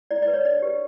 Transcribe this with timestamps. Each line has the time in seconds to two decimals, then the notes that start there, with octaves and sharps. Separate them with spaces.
0.11 E4 D5
0.22 D5
0.28 B4
0.34 C#5
0.45 D4 D5
0.62 G4 B4